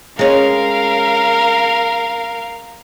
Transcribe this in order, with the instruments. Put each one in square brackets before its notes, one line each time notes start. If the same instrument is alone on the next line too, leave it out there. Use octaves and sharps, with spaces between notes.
[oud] G#3 C#4 [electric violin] A#4 F5